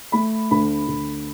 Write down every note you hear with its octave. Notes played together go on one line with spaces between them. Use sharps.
A3 B5
D2 B5
D2